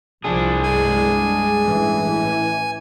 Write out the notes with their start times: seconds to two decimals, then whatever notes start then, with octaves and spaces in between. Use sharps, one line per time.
0.24 C2 F3 D4 G#4
0.64 G2 G#3 G#5
1.65 A1 E3